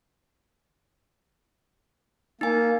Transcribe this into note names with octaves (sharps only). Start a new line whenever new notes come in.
A#3 D#4 G#5